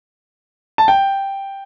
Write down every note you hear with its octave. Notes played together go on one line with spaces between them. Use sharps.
A5
G5